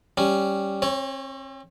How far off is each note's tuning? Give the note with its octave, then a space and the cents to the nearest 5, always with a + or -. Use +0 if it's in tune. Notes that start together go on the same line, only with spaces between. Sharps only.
G3 +0 C#4 +0
C4 +40 C#5 +0